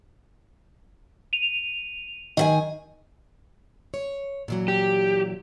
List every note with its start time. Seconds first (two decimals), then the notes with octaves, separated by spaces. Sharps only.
1.33 D#7 F7
2.37 D#3 D#5 E5 G#5
3.94 C#5
4.48 A#2 E3 F#3
4.68 G4